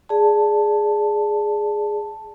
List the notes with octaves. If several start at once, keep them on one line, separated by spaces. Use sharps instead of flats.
G#4 D5 A5